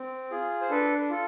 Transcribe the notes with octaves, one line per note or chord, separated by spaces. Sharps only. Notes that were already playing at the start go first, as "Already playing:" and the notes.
Already playing: C4
F4 G#4
C5
D4 A4 B4
F4 A4